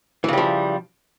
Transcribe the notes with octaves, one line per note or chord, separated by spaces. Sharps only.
C#3 E3 F3 G3